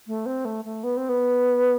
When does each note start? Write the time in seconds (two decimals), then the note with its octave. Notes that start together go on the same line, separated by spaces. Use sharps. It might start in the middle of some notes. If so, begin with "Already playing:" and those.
0.07 A3
0.26 C4
0.45 A3
0.65 A3
0.83 B3
0.97 C4
1.09 B3